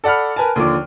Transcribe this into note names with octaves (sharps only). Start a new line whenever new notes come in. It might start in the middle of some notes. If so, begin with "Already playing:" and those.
A4 D5 F#5 B5 F6
A#4 B4 G#5 A5
D#2 D3 F3 D4 D6